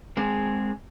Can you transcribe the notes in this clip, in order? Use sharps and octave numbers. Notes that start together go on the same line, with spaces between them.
G#3 C4 G#4